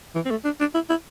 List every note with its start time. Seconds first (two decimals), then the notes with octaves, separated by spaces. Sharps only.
0.15 E3
0.25 C4
0.31 A3
0.44 D4
0.60 D4
0.74 E4
0.90 E4